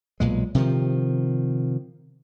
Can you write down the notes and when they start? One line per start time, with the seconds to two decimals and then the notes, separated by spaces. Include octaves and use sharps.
0.20 B1 A#2 G#3
0.55 C3 D#3 F3